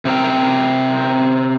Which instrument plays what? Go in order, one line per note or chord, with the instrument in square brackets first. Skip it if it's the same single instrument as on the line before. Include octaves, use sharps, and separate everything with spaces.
[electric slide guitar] C3 C4 A#4 G5